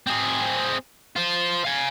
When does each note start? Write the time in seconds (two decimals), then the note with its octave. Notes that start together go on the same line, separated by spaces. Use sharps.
0.07 C4 G#4
1.16 F4 C5
1.64 F5 G#5